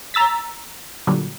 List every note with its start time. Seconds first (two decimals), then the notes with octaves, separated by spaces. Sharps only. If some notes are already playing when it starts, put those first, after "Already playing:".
0.14 A#5 E6 A6 B6
1.07 A#2 D3 F#3 G3